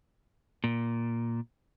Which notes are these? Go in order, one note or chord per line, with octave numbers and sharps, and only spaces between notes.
A#2